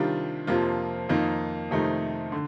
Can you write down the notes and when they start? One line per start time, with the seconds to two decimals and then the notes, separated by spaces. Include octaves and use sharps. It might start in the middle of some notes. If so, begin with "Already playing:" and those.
Already playing: C3 D#3 G3 D4 F4
0.47 F2 C3 F3 A#3 F4
1.09 F2 D#3 A#3 D#4
1.71 F2 C3 D#3 A3 D#4
2.32 D3